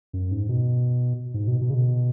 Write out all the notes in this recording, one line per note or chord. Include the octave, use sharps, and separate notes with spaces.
F#2
G#2
B2
G#2
B2
B2
C#3
B2